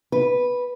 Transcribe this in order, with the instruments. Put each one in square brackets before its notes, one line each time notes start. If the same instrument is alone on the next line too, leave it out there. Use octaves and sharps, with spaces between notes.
[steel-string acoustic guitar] B4